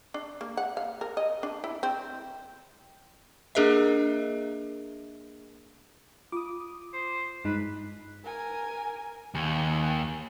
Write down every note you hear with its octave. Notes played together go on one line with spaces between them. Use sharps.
D4
A#3
F#5
F5
A#4
D#5
D4
E4
C4
A#3 D4 G#4 A#4 D#5 E5
F4 D6 D#6
C5
G2 G#3 D#4 B4
A#4 G#5
D#2 G#5